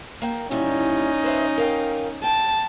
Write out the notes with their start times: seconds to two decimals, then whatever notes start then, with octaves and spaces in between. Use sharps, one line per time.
0.22 A#3 G5
0.51 A#2 E3 G3 C#4 D#4
1.24 B4 C5 E5
1.58 A#4 F5 G5
2.24 G5 A5